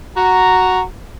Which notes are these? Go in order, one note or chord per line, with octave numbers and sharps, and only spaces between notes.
F#4 A#5